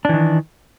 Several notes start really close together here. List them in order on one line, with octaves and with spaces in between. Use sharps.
D4 E3 D#3